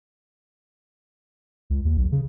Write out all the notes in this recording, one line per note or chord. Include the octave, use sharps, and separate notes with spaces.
C#2
D#2
B1
C#3